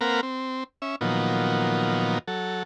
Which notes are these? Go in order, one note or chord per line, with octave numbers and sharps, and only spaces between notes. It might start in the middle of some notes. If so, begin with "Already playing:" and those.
A#3 C4 A#4 B4 F5 F#5
C4
C#4 E5
A#2 D#3 F3 F#3 B3
F#3 A4